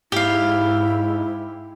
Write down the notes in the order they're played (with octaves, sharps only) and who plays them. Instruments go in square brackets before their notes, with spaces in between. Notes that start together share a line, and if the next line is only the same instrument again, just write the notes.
[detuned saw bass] G#2 [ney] E4 [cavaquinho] G4 F5